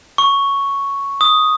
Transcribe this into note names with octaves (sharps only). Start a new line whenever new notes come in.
C#6
D#6